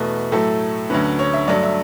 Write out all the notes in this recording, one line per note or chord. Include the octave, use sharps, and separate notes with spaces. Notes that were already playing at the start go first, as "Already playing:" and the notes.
Already playing: E2 B2 A3 B4
A2 F#3 A3 A4
D2 D3 F#3 C#4 B4
C#5
E5
G2 F#3 A3 D4 D5
E5